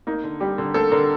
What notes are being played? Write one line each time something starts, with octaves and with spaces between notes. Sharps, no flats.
A#3 D#4
D3
G3 G4
D3
A#3 A4
D3 A#4